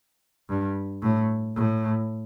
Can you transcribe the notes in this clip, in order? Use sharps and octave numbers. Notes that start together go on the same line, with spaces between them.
G2
A2
A2